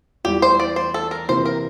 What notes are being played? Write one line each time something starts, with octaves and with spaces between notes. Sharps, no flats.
E2 E3 G3 G4
C5
D5
C5
A4
A#4
C3 E3 A#3 C5
A#4